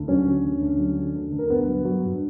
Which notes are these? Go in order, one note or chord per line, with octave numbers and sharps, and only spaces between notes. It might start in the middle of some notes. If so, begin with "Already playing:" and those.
Already playing: D2
F#3 C#4 C#5
D3
D2
D2
F#3
D3
D2
D2
A#4
G2 B3 B4
F#3
F#3
G2